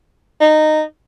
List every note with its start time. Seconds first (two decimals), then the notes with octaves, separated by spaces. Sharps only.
0.40 D#4